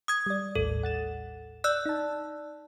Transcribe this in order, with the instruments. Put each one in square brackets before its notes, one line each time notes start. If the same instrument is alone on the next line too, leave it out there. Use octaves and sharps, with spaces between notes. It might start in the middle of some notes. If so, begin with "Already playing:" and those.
[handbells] D#6 G#6
[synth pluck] G3 D5
[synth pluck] A1 D#2 A2 [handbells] A4
[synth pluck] F#5 A6 E7
[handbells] D5 E6 F#6
[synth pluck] D#4 A5